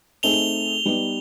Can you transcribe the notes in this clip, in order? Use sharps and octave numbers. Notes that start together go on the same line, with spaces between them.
A3 C4 D#4 G#4 F7 G7
G3 B3 D#4